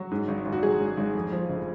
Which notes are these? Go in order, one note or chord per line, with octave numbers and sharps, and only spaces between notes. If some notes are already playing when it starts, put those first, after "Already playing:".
Already playing: F#3 F#4
G#2
G#1
G#1
F#4
F#3 G#4
G#2
G#1
F2
F3
F1